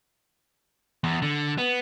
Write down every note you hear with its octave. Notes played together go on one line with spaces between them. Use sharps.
E2
D3
B3